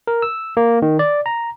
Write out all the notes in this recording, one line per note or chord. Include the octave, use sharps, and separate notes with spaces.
A#4
E6
A#3
D#3
D5
A#5